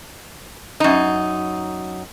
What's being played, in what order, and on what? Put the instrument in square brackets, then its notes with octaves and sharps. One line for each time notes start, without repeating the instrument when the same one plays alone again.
[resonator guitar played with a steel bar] F#2 D#4